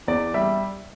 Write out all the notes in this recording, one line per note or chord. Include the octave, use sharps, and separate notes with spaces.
E2 D5
G3 E5